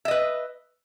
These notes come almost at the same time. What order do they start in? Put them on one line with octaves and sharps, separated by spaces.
E5 D#5 B4